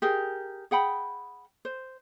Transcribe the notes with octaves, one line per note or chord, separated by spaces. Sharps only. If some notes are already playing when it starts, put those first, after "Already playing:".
G4 G#4 A#4 G#5
G#4 F#5 G5 B5
C5